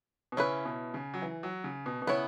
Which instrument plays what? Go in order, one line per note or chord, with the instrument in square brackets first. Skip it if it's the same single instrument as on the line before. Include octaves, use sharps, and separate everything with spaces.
[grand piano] B2
[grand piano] C#3 [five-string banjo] C#4 E4 B4
[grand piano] B2
C#3
F#3
E3
F#3
C#3
B2
B2
[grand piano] C#3 [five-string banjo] B3 E4 C#5